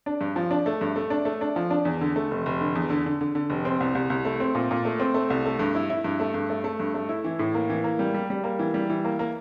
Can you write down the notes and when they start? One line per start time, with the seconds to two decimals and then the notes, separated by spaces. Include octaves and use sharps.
0.06 D4
0.21 G2
0.36 F3
0.51 D4
0.66 A3
0.81 G2
0.96 A3
1.10 D4
1.25 A3
1.41 D4
1.56 F3
1.70 D4
1.85 E2
2.01 D3
2.16 A3
2.31 F1
2.46 F1
2.61 D3
2.75 E2
2.90 D3
3.06 D3
3.21 D3
3.35 D3
3.50 F1
3.65 C4
3.80 C2
3.95 C2
4.10 C2
4.25 A3
4.40 C4
4.55 A#2
4.71 A#2
4.85 A3
5.00 C4
5.14 A3
5.30 C2
5.45 A3
5.59 G2
5.75 E4
5.90 E4
6.04 G2
6.20 A3
6.34 G2
6.50 A3
6.64 A3
6.80 G2
6.94 A3
7.09 E4
7.24 E3
7.39 A2
7.54 A#3
7.70 E3
7.84 A#3
7.99 G3
8.14 G3
8.30 G3
8.44 A#3
8.59 E3
8.74 G3
8.90 E3
9.05 A#3
9.19 A#3